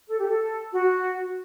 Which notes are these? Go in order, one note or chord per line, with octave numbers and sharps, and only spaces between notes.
A4
G4
A4
F#4